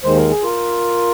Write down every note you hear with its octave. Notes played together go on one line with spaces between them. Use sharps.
D#2 D#3 G#3 C5
A#4
G#4
F4 A#4